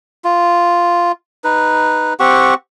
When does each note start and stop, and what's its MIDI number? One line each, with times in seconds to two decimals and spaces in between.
0.24 1.12 65
1.44 2.14 63
1.44 2.14 71
2.20 2.54 60
2.20 2.54 67
2.20 2.54 78
2.20 2.54 85